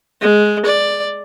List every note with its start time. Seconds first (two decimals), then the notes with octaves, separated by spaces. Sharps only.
0.21 G#3
0.65 D5